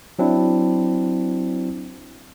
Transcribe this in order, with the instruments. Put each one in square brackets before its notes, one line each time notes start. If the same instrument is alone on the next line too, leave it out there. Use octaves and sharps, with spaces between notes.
[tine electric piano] F#3 C4 D4 E4